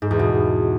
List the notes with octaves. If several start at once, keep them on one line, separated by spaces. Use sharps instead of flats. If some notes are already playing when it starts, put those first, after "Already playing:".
G#2
E2
B2